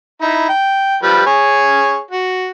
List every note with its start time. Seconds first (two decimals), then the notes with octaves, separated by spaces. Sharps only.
0.22 D#4 E4
0.49 G5
1.03 F3 G3 B4
1.27 G#4 C#5 G#5
2.11 F#4